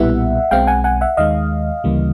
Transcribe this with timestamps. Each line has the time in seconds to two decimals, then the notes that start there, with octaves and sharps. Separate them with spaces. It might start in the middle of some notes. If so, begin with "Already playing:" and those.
Already playing: B1 A#2 G3 B3 E4 E5 F#5
0.51 B1 B2 G#3 C4 F5 G5
0.67 F#5 G#5
0.84 F#5 G#5
1.01 E5 F#5
1.17 D#2 D#3 G#3 D#5 F5
1.84 D2 C#3 E3 G3 A#3